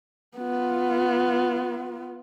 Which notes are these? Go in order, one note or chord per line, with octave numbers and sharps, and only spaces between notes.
B3 F4